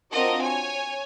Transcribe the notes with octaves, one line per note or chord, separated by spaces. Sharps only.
C4 D4 F4 F#4 A#4 D#5
C#5 G#5